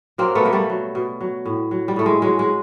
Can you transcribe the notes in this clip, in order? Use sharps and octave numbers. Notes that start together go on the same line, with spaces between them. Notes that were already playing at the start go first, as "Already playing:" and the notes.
F#3 A#3 C4
A3 B3
B2 A#3
G3 A3
F#3
B2
F#3
A2
F#3
G3
A2 A3
G#3
F#3 G#3
G#3